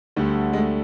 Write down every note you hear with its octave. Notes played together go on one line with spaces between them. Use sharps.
D2 D3 G3 A3
G#3
A3